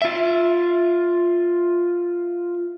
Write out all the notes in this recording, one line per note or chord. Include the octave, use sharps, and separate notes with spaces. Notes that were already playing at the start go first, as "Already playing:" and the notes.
F4 E5